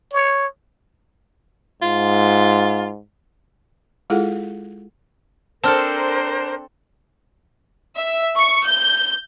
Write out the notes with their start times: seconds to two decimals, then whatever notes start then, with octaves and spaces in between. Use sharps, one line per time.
0.12 C#5
1.82 G#2 F4
4.10 G#3 E4 F4 G#4 A4 F#5
5.64 C4 D4 A4 A#4 C5 A5 F6
7.96 E5
8.37 C#6
8.66 G6